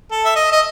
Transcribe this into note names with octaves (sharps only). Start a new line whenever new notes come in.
A4
E5
D#5
D#5